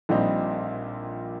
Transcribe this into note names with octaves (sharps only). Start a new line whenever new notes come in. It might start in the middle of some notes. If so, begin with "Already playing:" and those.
A#1 A#2 G3 C4 D#4